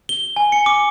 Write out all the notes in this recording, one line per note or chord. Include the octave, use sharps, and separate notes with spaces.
G7
G#5
C#7
D6